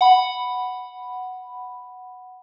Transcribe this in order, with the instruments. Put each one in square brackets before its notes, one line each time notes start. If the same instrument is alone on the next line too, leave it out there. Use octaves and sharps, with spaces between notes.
[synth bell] F#5 B5